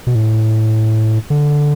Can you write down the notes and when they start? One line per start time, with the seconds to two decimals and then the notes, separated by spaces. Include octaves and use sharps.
0.07 B2
0.15 A2
1.30 D3